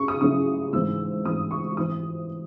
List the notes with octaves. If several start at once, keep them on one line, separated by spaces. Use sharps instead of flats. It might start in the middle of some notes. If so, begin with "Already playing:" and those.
Already playing: C#3 C#6
D#6
C#3 F#3 C#4 E4 D#6
G#2 E3 C4 E6
G#2 E3 C4 D#6
C#6
E3 C4 D#6